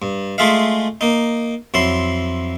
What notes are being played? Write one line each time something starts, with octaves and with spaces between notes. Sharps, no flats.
G2
G#3 A3 F4 G#4 E5 F5
A#3 D#4
F2 F#3 E4 C6